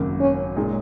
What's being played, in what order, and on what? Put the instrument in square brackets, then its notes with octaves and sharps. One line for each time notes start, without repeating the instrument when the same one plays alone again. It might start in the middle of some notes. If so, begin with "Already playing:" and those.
Already playing: [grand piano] G#1 F#2 C#3 F#3 A#3
[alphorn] C#4
[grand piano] A#2 G#3 D#4 G#4